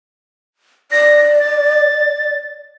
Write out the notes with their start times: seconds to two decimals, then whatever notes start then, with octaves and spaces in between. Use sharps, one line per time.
0.92 D5 A#6
1.40 A6